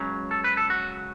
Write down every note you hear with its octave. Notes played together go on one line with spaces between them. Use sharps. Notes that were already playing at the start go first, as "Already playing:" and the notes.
Already playing: C#2 C#3 F#3
A4
B4
A4
F#4